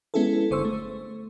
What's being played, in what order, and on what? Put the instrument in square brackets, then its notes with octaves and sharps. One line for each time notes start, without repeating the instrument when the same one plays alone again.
[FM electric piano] G#3 B3 C#4 E4 G#4 A4
G1 D3 C5 C#6 E6
A3